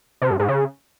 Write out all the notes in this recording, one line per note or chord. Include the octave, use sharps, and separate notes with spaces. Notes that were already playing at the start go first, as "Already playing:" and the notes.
C3
G2
G#2
C#3